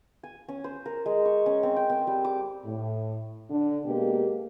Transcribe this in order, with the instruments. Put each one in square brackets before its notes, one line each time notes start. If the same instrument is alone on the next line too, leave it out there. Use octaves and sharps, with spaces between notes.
[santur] G#5
C#4
C5
A#4
G#3
C#6
C#4
C4
G5
C4
G3
D6
[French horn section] A2
D3
B2 G#3 A#3 G4